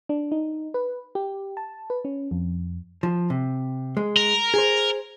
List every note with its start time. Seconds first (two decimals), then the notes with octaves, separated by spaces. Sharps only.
0.09 D4
0.32 D#4
0.74 B4
1.15 G4
1.57 A5
1.90 B4
2.05 C#4
2.31 F2
3.03 F3
3.30 C3
3.97 G#3
4.16 A#4
4.54 G#4 C5